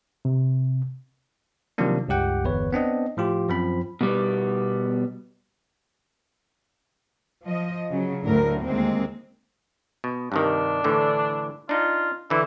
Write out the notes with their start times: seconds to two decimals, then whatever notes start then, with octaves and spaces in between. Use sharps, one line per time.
0.25 C3
1.78 C3 D#3 F3 F#3 A#3 D4
2.09 C#2 G2 G4 F#5 G5
2.44 G1 E2 B4 C#5
2.72 B3 C4 D4 D#5
3.17 A2 F3 F4 G4
3.49 F#2 F3 C4 B5
4.01 B2 G3 B3
7.44 F3 D#5
7.91 C#3 F#3
8.25 D2 A2 D3 A#4
8.62 D#2 G#3 A#3 C4
10.04 B2
10.32 G2 C3 D#3 D4
10.84 A2 D3 E3
11.69 D4 D#4 F4
12.30 D3 E3 E4